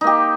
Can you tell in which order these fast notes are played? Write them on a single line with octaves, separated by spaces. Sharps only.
D#4 A#3 G4